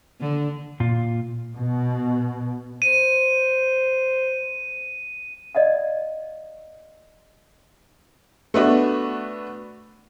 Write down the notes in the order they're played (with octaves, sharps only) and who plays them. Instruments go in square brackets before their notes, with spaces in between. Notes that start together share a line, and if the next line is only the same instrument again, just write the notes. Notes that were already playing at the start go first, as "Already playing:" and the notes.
[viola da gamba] D3
[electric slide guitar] A#2 F4
[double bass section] B2
[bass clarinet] C5 [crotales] D#7
[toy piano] D5 D#5 F5 F#5
[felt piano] A3 B3 D4 F#4